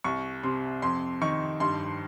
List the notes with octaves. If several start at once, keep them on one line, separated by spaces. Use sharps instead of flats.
C2 C#6
C3 C6
F2 C6
D#3 C#6
G2 C6